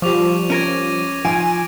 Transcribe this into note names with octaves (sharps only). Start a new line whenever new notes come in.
F3 G3 C#6 D6 F7
C#4 A#4 G#6 A#6 D#7
F3 G#5 D7